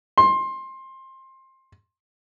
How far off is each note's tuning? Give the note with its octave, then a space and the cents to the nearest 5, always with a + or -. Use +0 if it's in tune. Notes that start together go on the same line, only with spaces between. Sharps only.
C6 +20